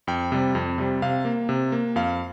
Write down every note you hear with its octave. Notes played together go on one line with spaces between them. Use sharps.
F2 G5
C3 G3
F2
C3 G3
C3 F5
A#3
C3
A#3
F2 F5